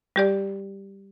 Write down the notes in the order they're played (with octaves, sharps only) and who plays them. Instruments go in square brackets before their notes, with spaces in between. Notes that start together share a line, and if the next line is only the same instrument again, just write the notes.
[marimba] G3 G4 D5